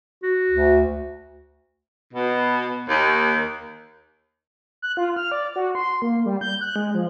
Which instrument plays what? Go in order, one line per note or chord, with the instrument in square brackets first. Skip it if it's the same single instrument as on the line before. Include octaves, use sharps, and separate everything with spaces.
[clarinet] F#4
[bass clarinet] D2
[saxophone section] B2
D#2
[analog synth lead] F#6
F4
F6
D5
F#4
C6
A#3
G3
G6
F#6
G#3
F3